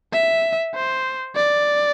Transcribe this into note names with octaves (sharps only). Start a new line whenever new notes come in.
E5
C5
D5